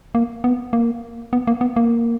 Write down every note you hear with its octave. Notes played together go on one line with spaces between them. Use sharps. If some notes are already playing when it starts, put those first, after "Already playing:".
A#3
B3
A#3
B3
A#3
B3
A#3